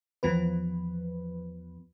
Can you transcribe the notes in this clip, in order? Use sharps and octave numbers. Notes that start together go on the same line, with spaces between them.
E2 F3 B3 B4